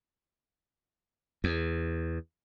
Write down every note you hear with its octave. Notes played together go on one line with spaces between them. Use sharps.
E2